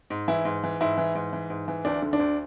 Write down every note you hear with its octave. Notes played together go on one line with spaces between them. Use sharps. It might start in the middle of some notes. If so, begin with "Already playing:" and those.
G#2
E3 E4
G#2
E3
G#2 E4
E3
G#2
E3
G#2
E3
D2 D4
D3
D4
D2